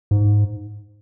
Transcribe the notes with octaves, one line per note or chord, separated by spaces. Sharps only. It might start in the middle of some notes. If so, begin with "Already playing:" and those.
G#2